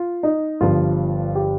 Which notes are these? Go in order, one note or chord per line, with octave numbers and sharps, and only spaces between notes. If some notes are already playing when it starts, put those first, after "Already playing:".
Already playing: F4
D#4
G1 G2 F3 F4
G4